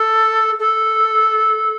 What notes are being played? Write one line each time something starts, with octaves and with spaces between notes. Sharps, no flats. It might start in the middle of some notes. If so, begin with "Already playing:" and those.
Already playing: A4
A4